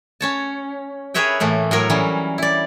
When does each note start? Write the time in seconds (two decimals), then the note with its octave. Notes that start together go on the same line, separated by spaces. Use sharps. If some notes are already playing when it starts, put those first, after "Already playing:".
0.21 C#4 C#5 A5
1.14 G#4 A#4 B4 C#5 E5 G5
1.40 A2 E3 A3 A#3
1.71 A2 F#3 A#4 C#5
1.90 E3 F#3 G3 C#4
2.38 E4 D5